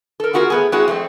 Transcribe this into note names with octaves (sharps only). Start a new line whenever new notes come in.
A4 A#4
B3 F4 F#4 G#4 A#4
A3 B3 G#4
G#3 C4 E4 F#4 G#4
F2 A3 C4